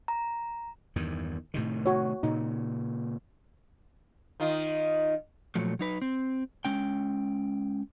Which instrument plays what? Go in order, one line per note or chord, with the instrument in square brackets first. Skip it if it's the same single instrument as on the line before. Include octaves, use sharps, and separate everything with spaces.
[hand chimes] A#5
[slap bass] E2 G2 D#3
A2 C3 D#3
[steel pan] F#4 C#5
[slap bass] A#2 C#3 [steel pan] D#4
[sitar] D#3 D#4 F4
[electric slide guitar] A#2 F3 F#3 A3
F#3 D#4 B4
C4
G#3 C#4 G5